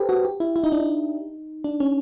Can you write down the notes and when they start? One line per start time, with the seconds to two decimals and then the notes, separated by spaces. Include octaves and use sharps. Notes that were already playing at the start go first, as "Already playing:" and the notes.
Already playing: G4 A4 B4 C5
0.09 F#4
0.25 G4
0.40 E4
0.56 E4
0.64 D#4
0.72 D4
0.80 D#4
1.64 D4
1.80 C#4